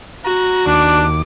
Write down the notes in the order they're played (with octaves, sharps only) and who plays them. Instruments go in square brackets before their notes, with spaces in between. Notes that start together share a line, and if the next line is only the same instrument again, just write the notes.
[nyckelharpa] F#4 [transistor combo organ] A#5
[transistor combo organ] D#2 D6 [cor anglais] D4